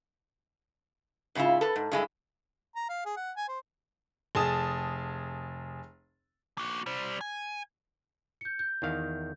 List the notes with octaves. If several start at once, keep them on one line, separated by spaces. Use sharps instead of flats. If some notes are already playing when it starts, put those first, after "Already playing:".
G#2 C#3 F#3 E4 F4
A4 B4
G#2
G2 G#3 E4
A#5
F5
G#4
F#5
G#5
C5
F1 G#4 A5 D#6
A#3 F#4
G3 C5
G#5
G6 C#7
G6
E2 D#3 F5